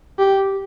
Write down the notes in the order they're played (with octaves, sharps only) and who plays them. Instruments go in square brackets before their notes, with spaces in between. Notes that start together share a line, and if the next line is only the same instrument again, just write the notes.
[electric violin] G4